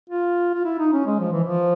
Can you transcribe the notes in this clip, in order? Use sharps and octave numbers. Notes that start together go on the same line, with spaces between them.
F4
F4
E4
D#4
C#4
G#3
F3
E3
F3